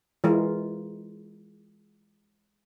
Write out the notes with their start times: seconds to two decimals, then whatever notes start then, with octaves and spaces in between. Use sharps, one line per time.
0.24 E3 G#3 F4 A#4